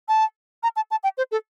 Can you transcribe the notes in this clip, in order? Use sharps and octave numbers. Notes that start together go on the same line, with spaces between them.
A5
A#5
A5
A5
G5
C5
A4